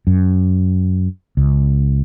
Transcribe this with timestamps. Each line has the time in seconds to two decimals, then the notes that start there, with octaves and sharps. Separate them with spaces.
0.07 F#2
1.37 C#2